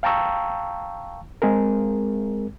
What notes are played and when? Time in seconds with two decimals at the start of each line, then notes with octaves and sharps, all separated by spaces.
0.03 F5 G5 A5 A#5 C#6 E6
1.42 G#3 C4 G#4 A#4